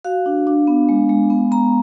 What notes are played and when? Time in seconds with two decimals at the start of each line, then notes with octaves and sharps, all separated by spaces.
0.04 F#4 F5
0.26 D4
0.47 D4
0.67 B3
0.89 G#3
1.09 G#3
1.30 B3
1.51 B3 A#5